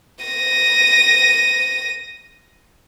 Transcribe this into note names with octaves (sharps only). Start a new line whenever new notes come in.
A#6 D#7